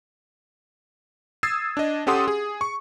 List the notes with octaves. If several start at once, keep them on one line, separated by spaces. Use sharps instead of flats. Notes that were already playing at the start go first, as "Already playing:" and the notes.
D#6 E6 G#6 A6 C7
D4 D#5
C#4 G4 A4 F#5 C6 D#6
G#4
C#6